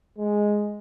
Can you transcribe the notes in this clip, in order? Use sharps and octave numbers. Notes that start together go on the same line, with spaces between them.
G#3